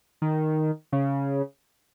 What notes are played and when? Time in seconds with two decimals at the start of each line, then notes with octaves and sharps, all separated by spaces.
0.22 D#3
0.92 C#3